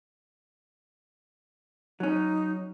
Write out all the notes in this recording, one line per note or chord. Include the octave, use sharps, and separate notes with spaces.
F#3 C#4 D#4